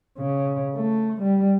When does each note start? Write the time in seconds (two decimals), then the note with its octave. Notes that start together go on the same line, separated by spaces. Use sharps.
0.18 C#3
0.76 A3
1.21 G3